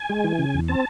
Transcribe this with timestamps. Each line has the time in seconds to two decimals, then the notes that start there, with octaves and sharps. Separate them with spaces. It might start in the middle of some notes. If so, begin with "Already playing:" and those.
Already playing: G#5
0.10 G#3
0.24 E3
0.39 C#3
0.54 E2
0.68 C4 A5